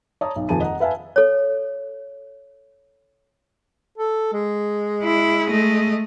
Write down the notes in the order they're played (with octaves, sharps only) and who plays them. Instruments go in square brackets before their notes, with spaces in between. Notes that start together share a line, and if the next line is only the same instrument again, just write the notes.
[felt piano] C#5 D5 A5 A#5 D#6
B1
D#1 F2 G#4 A5 D#7
D#5 F#5 A#5
B4 E5 F5 G#5 A5
[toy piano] A4 C#5
[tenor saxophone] A4
G#3
[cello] E4
A3 D#5